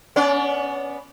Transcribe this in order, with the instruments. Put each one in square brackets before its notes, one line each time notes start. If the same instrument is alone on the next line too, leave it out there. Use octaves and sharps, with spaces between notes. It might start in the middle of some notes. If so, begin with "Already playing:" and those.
[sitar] B3 C#4 D5